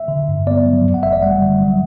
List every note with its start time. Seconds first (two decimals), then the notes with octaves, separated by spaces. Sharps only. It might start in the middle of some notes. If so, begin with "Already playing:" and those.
Already playing: E5
0.08 D3
0.28 G2
0.47 B3 D5
0.66 F#3
0.84 F#2
0.94 F#5
1.03 G1 E5
1.13 D5
1.22 G3 F#5
1.42 D3
1.61 F#3